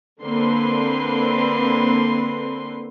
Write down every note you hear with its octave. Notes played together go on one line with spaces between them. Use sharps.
D3 A#3 C4 B4 C6